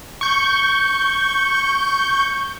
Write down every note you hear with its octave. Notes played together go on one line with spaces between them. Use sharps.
C#6 G6